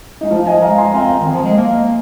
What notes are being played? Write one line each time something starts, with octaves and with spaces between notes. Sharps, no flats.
G#3 D#4
F3 F4
D#5 G#5
G#3 F5 A#5
G#5 C6
C4 F5 A#5
D#3
F3
G#3
A#3